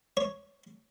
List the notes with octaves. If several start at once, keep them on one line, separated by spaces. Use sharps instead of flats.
C#5